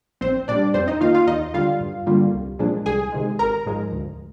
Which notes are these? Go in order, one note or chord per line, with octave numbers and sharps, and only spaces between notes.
A#1 C4 C5
A#2 G3 D4 D5
F2 C4 C5
D#4 D#5
D#3 A#3 F4 F5
F4 F5
D#2 D#4 D#5
D3 G3 F4 F5
G2
D3 G3 A#3 F4
C2
A#2 F3 G#3 D4
C2 G#4 G#5
C3 D#3 G#3
G#1 A#4 A#5
G#2 F3 G#3
D2